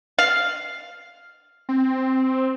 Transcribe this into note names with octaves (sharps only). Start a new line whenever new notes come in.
F5
C4